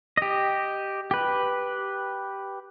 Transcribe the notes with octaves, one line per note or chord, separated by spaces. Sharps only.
G4 D#5
G4 B4